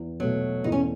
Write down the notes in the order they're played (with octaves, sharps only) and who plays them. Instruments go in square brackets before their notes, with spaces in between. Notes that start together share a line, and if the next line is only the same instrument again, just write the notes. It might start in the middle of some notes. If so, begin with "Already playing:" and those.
Already playing: [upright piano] E2
[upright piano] B2 A3 [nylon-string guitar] F#3
[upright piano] E2 [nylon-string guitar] D#4
[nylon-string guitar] C#4